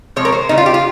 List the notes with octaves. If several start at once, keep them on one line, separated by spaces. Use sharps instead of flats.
C3 F3 G#3 C#5
A#4
C5
C#3 G3 D#4
F4
G4
F4